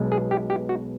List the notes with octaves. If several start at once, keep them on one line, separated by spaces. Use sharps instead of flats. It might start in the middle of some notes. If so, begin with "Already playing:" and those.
Already playing: B1 B2 G#3
G#4
G4
G4
F#4